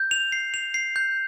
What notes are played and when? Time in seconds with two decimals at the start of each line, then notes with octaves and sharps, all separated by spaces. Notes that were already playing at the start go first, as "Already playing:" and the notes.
Already playing: G6
0.11 F7
0.32 C7
0.54 F7
0.74 C7
0.96 G6